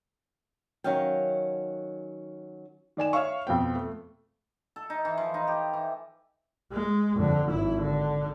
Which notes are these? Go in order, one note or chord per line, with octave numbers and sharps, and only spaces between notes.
D#3 F#3 C#4 D#5 F5 G5
D#3 D5 G#5 E7
C#5 E5 F5 C#6
F2 B2 C4 G5
A3
A4
D#4
E3
F3
D#4
G4
E3
G#3
F2 D3
G#1 E4
D3